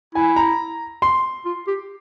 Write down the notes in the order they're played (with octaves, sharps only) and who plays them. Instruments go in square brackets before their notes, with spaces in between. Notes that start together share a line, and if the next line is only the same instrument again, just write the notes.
[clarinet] E4 [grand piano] G#5
[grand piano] A#5
C6
[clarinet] F4
G4